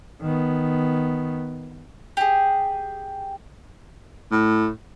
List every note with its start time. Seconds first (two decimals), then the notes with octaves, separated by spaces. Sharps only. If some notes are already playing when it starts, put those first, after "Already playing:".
0.22 D#3 B3
2.17 G4 G#4
4.32 A2